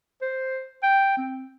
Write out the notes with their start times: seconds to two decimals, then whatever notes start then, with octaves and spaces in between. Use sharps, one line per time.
0.22 C5
0.83 G5
1.17 C4